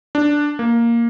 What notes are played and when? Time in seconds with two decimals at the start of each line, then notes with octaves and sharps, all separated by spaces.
0.15 D4
0.59 A#3